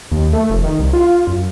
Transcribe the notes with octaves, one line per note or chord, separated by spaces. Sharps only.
D#2
A3
F1
D#3
C2
F4
F#2